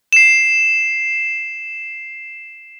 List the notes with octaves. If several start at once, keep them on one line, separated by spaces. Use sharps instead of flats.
C7 E7